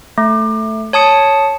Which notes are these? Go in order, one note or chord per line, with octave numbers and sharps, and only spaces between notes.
A3
C#5 A5 D#6 C#7